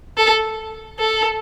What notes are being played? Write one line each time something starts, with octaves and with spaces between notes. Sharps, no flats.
A4
A4